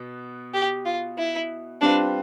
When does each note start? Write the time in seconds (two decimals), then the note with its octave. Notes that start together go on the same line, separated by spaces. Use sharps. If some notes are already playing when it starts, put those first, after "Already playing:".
Already playing: B2 B3
0.54 G4
0.86 F4
1.18 E4
1.81 G3 C4 D4 F4 B4